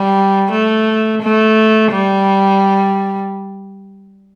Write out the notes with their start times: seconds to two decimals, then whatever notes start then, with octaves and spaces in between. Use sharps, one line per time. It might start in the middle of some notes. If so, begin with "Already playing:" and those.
Already playing: G3
0.52 A3
1.22 A3
1.92 G3